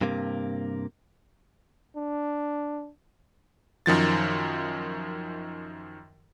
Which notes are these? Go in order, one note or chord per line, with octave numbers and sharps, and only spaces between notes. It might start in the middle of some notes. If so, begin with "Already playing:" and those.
G2 C3 A#3
D4
F#2 D#3 F3 A6